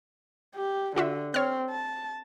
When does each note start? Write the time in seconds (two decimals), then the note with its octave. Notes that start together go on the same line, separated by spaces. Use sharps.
0.55 G4
0.96 D3 F4 F#4 E5
1.34 C4 C#5 F6
1.70 A5